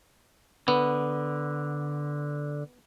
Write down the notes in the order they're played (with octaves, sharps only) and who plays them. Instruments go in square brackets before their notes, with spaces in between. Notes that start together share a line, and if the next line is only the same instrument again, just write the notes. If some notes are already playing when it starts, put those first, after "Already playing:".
[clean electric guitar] D3 [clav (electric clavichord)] B3